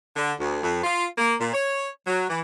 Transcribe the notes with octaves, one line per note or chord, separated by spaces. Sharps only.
D3
D2
F2
F4
A#3
A#2
C#5
F#3
E3